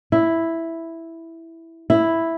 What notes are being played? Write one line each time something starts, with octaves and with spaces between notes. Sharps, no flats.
E4
E4